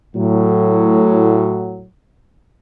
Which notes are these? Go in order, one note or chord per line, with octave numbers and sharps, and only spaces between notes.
A2 F#3